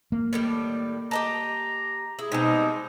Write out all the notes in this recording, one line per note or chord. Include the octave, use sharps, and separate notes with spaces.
A#3
A2 D#3 G3
G4 D#5 A5 A#5
E4 G#4
B2 G3 G#3 C4 D#4